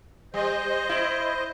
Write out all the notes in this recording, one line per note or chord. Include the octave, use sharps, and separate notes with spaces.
G3 C5 D#5
E4